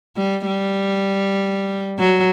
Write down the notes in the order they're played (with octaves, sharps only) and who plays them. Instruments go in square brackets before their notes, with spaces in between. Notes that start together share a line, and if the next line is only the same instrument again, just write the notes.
[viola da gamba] G3
G3
F#3